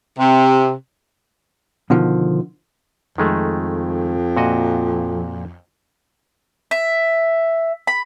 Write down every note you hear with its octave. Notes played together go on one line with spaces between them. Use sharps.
C3
B2 D3 D#3 F3
F2 D#3 G#3 A3
A#2 F#4 D#5
E5
B5